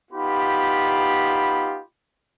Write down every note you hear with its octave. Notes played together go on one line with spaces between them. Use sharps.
B3 D#4 F4 G4 B5